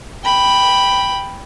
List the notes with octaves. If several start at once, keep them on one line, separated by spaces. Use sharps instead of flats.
G5 B5